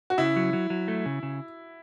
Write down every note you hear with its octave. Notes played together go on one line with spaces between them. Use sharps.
F#4
C#3 E4
F#3
F#3
F#3
A3
C#3
C#3